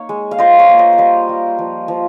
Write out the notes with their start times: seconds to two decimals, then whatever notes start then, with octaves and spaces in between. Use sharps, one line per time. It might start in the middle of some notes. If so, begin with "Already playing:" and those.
Already playing: A#3 D#4 C#5 F5
0.09 G#3
0.31 F5
0.38 F4 C5 D#5
0.59 A#4 C#5
0.69 A#3
0.79 C5 D#5
0.93 F5
0.98 G3 C5 D#5
1.29 G3
1.59 F3
1.88 F3